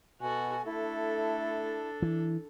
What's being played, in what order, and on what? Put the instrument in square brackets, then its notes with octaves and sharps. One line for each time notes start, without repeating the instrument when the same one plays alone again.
[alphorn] B2 [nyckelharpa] F#4 A4 [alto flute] G#5
[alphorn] A3 [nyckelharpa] D4 A4 [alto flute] E4
[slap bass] E3